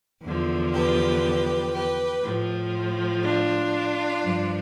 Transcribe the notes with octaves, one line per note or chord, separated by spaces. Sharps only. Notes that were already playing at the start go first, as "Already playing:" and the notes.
E2 D3 F3
G4 B4
G4 B4
A2 F3
D4 F4
G2 F3